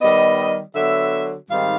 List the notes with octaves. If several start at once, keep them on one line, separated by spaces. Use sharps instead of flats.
D#3 G3 B3 D#5
D3 F#3 B3 E5
G#2 D#3 G3 C4 F5